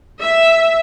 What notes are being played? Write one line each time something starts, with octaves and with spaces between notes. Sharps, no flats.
E5